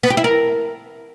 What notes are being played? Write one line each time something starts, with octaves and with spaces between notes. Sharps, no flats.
B3
G4
E4
A#4